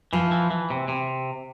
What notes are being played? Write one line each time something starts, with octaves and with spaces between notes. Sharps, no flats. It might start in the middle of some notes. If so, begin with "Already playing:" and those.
E3 F3
E3
E3
C3
C3